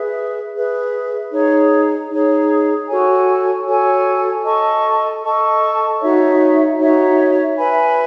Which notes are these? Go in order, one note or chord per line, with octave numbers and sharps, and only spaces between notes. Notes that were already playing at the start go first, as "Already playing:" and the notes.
Already playing: G#4 B4 E5
G#4 B4 E5
D#4 G#4 C#5
D#4 G#4 C#5
F#4 A4 C#5 G#5
F#4 A4 C#5 G#5
A4 D#5 A5 C#6
A4 D#5 A5 C#6
D#4 F#4 C#5 E5
D#4 F#4 C#5 E5
B4 E5 G#5 B5